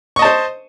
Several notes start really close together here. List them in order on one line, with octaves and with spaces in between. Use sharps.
C#6 D#5 A5 C5